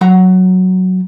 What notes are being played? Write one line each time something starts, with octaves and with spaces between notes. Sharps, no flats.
F#3 F#5 A#5